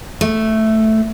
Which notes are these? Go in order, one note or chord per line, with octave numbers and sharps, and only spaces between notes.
A3